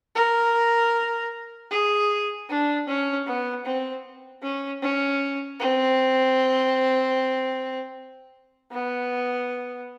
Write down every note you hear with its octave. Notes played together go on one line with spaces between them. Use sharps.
A#4
G#4
D4
C#4
B3
C4
C#4
C#4
C4
B3